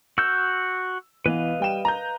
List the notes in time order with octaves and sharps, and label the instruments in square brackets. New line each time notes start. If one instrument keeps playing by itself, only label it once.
[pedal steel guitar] F#4 G6 [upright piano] E6
[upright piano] E3 B3 [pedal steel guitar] B4 D#5 F5
[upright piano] G3 G5 E7
A#5 G6